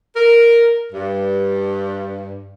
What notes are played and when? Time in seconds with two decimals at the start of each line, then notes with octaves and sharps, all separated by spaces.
0.15 A#4
0.91 G2